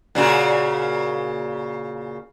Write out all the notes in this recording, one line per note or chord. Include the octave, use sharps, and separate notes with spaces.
A#2 C#3 F#4